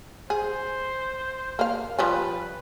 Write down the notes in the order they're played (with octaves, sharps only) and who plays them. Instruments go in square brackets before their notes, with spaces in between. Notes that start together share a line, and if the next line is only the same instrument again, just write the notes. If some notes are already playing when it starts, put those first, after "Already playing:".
[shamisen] G#4 [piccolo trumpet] C5
[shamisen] A#3 F5
[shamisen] F3 G3 C#4 [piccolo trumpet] B4